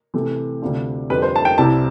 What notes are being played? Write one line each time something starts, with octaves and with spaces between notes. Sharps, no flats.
C3 E3 A3
D2 C3 G3 D4 F4
F2 D3 G3 B4
C5
A5
G5
C2 C3 G3 C4 E4 A5